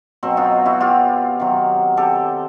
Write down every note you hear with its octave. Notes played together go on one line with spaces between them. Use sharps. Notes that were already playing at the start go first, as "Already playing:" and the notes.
B2 F#3 C4
D#4 F4
E4 F#4
F4 G4
C3 D#3 F#3
G4 A4